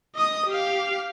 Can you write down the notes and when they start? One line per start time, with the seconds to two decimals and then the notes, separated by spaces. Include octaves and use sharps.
0.16 D#5 D#6
0.47 G4 F5